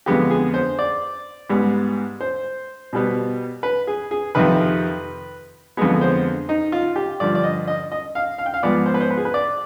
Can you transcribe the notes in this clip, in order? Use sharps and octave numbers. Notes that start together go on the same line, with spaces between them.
F2 D3 G#3 B3 G4
G#4
C5
D5
G#2 G3 B3
C5
B2 G3 B3
B4
G#4
G#4
F2 C3 D#3 B4
F2 D3 G#3 B3 G#4
C5
D#4
F4
G4
G2 D3 F3 D5
D5
D#5
D#5
D#5
F5
F5
G5
F5
G#2 F3 B3 D5
C5
B4
C5
B4
G#4
B4
D5